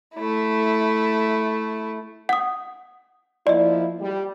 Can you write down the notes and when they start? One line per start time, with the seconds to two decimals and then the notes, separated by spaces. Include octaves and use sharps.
0.14 A3 E4
2.29 F#5 D#6
3.47 F3 A#3 E4 D5 D#5
4.02 G3